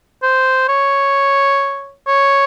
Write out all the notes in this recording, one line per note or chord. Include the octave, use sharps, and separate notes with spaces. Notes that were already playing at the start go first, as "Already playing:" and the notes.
C5
C#5
C#5